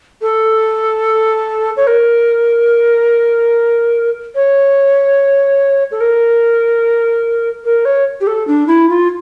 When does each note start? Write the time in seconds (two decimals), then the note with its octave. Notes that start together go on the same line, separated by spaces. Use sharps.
0.22 A4
1.77 C#5
1.87 A#4
4.35 C#5
5.91 A4
6.00 A#4
7.65 A#4
7.85 C#5
8.21 G4
8.27 A4
8.47 D4
8.67 E4
8.89 F4